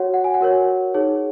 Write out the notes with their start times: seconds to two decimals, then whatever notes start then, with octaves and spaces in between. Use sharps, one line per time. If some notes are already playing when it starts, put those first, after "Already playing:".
Already playing: F#4 C#5 F#5
0.14 F#5
0.24 G#5
0.34 F#5
0.41 F#4 A#4 C#5
0.94 D#4 G#4 C#5